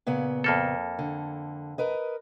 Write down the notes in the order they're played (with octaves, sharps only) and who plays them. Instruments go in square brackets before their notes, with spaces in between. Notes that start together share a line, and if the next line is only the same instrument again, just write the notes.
[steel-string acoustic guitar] A#2 C#3 B3
[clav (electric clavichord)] F2 A#3 A4
[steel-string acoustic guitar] D3
A#4 B4 D#5